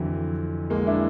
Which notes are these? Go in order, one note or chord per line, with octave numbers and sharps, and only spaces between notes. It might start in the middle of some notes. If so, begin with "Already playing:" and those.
Already playing: F2 D3 E3 F#3
G#3 A#3
D4 E4